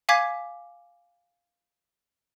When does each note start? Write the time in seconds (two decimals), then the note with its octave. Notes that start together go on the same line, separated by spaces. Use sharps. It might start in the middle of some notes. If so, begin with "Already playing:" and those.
0.09 F5 G#5 D6 G#6 B6